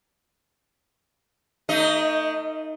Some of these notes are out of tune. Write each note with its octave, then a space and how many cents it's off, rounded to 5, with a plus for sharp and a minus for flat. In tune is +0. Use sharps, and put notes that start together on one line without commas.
A3 +35 D#4 +0 D#5 +25